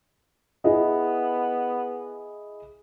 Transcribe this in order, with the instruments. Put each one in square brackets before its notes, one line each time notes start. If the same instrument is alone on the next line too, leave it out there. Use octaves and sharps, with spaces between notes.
[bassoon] B3 [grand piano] E4 G#4 D#5